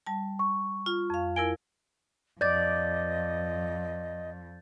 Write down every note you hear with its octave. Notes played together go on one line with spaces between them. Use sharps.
G3 A5
C#6
F4
F2 F5
E4 A#4 G#5 G#6 D7 G7
F2 D5 D#5 G6 A6